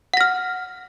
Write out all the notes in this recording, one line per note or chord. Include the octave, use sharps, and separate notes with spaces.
F#5 F6 A#6